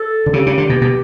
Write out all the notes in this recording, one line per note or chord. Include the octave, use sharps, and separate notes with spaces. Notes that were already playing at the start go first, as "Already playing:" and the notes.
Already playing: A4
D3
C#3 G4
C#3
D3
B2
B2